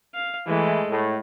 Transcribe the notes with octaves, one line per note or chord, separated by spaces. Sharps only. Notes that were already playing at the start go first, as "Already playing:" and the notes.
F5
E3 G#3 A3
A2